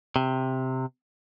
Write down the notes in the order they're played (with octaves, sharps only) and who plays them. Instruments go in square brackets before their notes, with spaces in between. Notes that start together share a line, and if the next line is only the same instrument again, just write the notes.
[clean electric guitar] C3